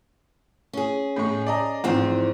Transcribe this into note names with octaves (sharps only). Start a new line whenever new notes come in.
C#4 G#4
A2 G#3 C#6
D5 D#5 A#5
E2 G#2 F3 C4